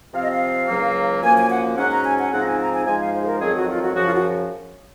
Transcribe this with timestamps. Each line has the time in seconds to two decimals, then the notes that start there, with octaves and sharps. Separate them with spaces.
0.14 C3 F3 C4 F5
0.22 D#5
0.31 F5
0.68 C#2 C#3 F#3 A#3
1.23 F#2 F3 A#3 G#5
1.37 G#5
1.50 F#5
1.77 G#2 F#3 C#4 F#5
1.91 A#5
2.04 G#5
2.18 F#5
2.32 G#2 F3 C4 D#4 F#5
2.40 A#5
2.45 G#5
2.59 A#5
2.72 G#5
2.86 G#2 F3 G#3 D#4 G#5
3.00 F5
3.13 C5
3.22 G#4
3.26 A#4
3.41 F2 D#3 F#3 C4 G#4
3.54 F#4
3.69 F4
3.82 F#4
3.95 F#2 C#3 F3 F#4
4.06 F4
4.13 F#4